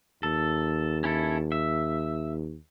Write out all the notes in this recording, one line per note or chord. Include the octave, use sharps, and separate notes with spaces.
D#2 A4
C#4 E4 A4
E5